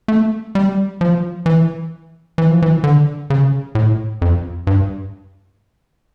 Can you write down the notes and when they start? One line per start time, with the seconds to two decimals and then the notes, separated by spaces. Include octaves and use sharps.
0.08 A3
0.55 G3
1.01 F3
1.46 E3
2.38 E3
2.50 F3
2.62 E3
2.84 D3
3.30 C#3
3.75 A2
4.22 F2
4.67 G2